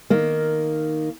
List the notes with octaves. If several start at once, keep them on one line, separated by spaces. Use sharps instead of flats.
D#3 A#3